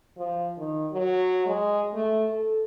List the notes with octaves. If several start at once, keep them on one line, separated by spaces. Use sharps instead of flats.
F3
D#3
F#3
G#3
A3
A4